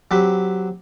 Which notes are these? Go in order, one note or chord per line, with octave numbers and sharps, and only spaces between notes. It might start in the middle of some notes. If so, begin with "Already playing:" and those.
F#3 C4 G4 B4